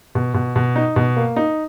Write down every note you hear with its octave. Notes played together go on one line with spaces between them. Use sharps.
B2
B2
B2
D#4
B2
A#3
D#4